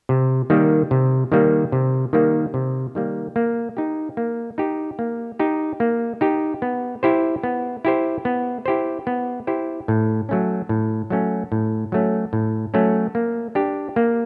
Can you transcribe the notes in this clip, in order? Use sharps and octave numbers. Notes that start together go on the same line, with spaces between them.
C3
D#3 G3 A#3
C3
D#3 G3 A#3
C3
D#3 G3 A#3
C3
D#3 G3 A#3
A#3
D#4 G4
A#3
D#4 G4
A#3
D#4 G4
A#3
D#4 G4
B3
E4 G4 C5
B3
E4 G4 C5
B3
E4 G4 C5
B3
E4 G4 C5
A2
F#3 A3 C#4
A2
F#3 A3 C#4
A2
F#3 A3 C#4
A2
F#3 A3 C#4
A#3
D4 G4
A#3